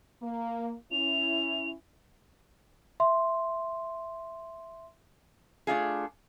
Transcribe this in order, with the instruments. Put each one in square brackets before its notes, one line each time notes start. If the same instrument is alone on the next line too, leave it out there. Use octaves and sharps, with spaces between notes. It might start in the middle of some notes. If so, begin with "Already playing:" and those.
[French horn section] A#3
[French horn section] C#4 E4 [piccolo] F7
[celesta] E5 C6
[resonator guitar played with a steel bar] A3 D4 F4 G#4